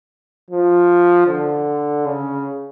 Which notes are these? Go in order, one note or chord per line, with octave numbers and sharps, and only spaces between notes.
F3
D3
C#3